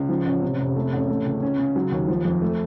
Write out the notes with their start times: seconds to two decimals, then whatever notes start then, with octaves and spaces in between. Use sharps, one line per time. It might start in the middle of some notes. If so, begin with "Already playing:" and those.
Already playing: C#2
0.09 F3
0.25 A1
0.42 C3
0.59 F1
0.76 A3
0.93 A1
1.08 A3
1.25 C#2
1.42 C#4
1.59 C#3
1.76 F#3
1.92 D#2
2.08 F3
2.25 F2
2.42 A3